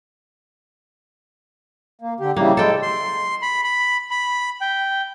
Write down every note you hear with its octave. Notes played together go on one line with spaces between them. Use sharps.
A#3
D3 G4
C#3 E3 G3 A#3
G#3 A4 G5
C6
B5
B5
B5
G5